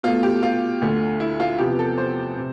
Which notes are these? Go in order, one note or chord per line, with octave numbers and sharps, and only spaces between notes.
B2 A3 F4
G4
F4
D2 D3 A3
E4
F4
E2 C3 F3 B3 G4
A4
C5
C3